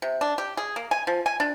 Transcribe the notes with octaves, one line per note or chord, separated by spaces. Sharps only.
C3
D4
G4
G#4
A#3
G#5
F3
G#5
D4